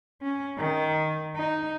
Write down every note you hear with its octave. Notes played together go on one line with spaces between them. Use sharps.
C#4
D#3
D#4